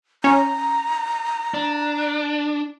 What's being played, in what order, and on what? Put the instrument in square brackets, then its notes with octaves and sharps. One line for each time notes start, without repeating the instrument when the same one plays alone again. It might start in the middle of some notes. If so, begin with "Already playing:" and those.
[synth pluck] C#4 [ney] A#5
[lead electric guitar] D4